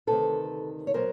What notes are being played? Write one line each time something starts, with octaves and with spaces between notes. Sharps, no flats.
D2 C3 D#3 A4 B4
C#5
B2 F#3 B3 A#4 C5